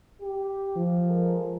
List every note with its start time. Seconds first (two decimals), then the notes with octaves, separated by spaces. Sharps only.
0.21 G4
0.76 F3
1.08 G#3 A4 A#4